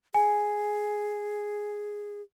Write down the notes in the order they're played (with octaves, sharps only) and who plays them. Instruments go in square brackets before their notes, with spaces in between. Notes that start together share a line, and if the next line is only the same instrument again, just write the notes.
[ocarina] G#4 [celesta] G#5